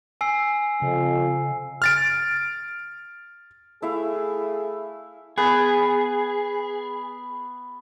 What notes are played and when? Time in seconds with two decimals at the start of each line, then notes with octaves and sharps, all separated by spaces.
0.21 G#5 E6 C7
0.82 F2 C#3
1.82 F6 A6 D7
3.82 A3 E4 G#4 E5 F5
5.38 B3 G#4